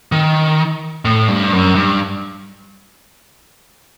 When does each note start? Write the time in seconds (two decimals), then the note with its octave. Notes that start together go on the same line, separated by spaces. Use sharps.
0.12 D#3
1.05 A2
1.28 G2
1.52 F#2
1.75 G2